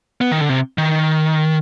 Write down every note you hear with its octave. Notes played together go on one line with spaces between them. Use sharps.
B3
D#3
D3
C3
D#3